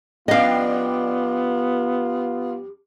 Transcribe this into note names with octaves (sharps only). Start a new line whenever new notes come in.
F2 G3 B3 D4 F4 D#5 F5